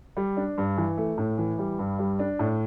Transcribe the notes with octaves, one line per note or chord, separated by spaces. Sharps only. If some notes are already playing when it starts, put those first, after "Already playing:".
G3
D4
G2
E3
A3
A2
E3
G3
G2
G3
D4
A2